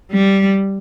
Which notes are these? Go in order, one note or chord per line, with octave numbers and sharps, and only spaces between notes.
G3